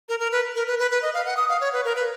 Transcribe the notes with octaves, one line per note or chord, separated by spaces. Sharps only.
A#4
A#4
B4
A#4
B4
B4
B4
D#5
F5
F#5
D#6
F5
C#5
B4
A#4
B4